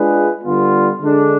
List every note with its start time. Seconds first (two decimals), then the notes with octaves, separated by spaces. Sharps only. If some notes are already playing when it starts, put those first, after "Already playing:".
Already playing: G#3 D4 F4 G#4 B4
0.43 D3 G3 B3 F4
1.01 D3 G#3 D4